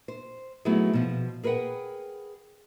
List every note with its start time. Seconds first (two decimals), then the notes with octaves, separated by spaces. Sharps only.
0.08 C5
0.65 F#3 A3 B3 D#4 E4 G#4
0.93 B2 F3
1.43 G#4 A#4 B4 C#5 F#5 G5